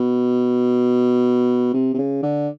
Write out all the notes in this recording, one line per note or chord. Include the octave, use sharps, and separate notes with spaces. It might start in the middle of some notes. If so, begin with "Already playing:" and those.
Already playing: B2
C3
C3
C#3
D3